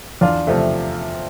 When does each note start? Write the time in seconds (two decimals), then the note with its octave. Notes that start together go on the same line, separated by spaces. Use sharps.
0.21 E2 D4 F4
0.47 C3 F3 A3